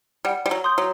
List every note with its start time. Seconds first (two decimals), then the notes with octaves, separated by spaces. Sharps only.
0.25 G3 F#5
0.46 G3
0.51 F#3
0.64 C6 D#6 G6
0.78 F#3